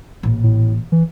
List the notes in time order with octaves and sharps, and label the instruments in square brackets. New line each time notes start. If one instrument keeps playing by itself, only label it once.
[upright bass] A1 A#2
[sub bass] A2
E3